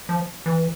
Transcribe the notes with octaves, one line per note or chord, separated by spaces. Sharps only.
F3
E3